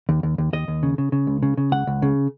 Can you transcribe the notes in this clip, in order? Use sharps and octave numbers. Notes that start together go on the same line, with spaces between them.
D#2
D#2
D#2
D#2 D#5
D#2
C#3
C#3
C#3
C#2
C#3
C#3
C#2 F#5
C#2
C#3